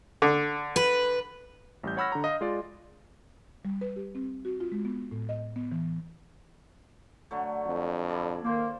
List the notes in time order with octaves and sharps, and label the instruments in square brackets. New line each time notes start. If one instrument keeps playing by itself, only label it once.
[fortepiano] D3
[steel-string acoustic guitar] B4
[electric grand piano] A1 G3 G6
C#5 F#5 B5 E6 F6 A#6
D3 A#5
D#5 F5
G#3 F4 D5
[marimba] G3
B4
G4
C4
F#4
F4
G#3
B3
A2
D#5
B3
E3
[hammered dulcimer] D3 F#3 A3
[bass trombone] F2
[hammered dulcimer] E4 A4 D5
[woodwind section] D#3 A#3 [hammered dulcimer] C5 F5